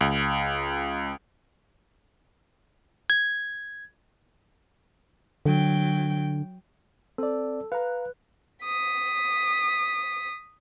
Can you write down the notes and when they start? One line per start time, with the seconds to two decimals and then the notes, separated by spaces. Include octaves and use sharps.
0.01 C#2
3.10 G#6
5.46 D3 F#3 G5
7.18 C4 A4 D5
7.72 B4 F5 A#5
8.64 D#6 B6